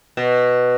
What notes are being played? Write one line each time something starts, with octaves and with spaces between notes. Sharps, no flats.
B2